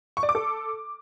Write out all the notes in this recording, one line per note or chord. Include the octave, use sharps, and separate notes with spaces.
C#6
D5
D6
A4